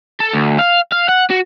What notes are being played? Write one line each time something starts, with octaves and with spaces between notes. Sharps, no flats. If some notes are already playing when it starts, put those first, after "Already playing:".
A4
D2
F5
F5
F#5
F#4